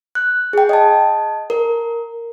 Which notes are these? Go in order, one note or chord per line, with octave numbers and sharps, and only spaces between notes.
F#6
G#4 G5
D#5 A5
A#4